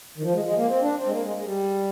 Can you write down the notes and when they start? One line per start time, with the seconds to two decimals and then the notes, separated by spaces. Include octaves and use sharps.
0.18 D#3
0.23 F3
0.34 G#3
0.45 G#3
0.57 A#3
0.68 C4
0.82 D4
0.97 C4
1.06 G#3
1.12 A#3
1.23 G#3
1.38 G#3
1.45 G3